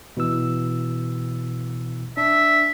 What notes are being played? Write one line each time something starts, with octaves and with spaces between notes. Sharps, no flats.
B2 E3 E6
D4 E5